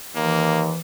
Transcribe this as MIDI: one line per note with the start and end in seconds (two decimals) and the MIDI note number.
0.16 0.73 39
0.16 0.80 52
0.16 0.63 58